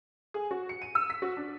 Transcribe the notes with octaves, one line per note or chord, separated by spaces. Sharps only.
G#4
F#4
C#7
D#7
E6
B6
F#4
D4